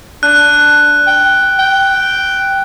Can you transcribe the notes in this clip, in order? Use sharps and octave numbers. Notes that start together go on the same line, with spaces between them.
D4 F#6
G5
G5